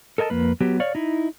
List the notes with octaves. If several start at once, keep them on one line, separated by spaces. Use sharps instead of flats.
A4 A#4 D#5 G#5 A5
F2 A#3 B4
F#3 B3 G4
C#5 D5 F5
D#4 E4